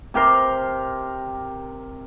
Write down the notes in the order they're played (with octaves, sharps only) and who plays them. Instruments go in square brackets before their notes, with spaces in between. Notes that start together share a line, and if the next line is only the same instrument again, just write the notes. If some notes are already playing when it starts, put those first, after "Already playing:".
[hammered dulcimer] C3 G4 A#4 C6